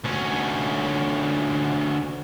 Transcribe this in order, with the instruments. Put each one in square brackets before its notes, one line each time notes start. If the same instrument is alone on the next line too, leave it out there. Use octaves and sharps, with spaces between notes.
[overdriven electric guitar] D2 C#4